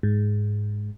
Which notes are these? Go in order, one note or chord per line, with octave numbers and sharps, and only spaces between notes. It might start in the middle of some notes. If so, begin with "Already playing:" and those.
G#2